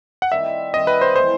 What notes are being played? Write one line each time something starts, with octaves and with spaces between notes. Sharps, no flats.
F#5
D#3 G3 C4 E5
D#3 G3 C4 D#5
B4
C5
E3 A3 E4 A4 C5